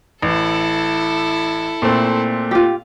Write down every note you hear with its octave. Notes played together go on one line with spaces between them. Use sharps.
A1 E4 A4
A#2 A3 C4
F4 G4